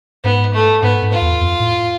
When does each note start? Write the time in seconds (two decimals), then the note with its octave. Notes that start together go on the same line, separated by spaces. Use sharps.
0.24 G#2 B3
0.54 A3
0.82 G#2 B3
1.02 G#2
1.12 F4
1.21 E2
1.41 F2
1.60 A2